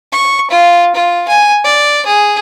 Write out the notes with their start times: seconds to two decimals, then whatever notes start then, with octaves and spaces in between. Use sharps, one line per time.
0.12 C#6
0.51 F4
0.95 F4
1.28 G#5
1.64 D5
2.06 G#4